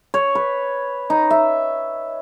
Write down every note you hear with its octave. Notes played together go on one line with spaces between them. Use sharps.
C#5
B4
D#4
E5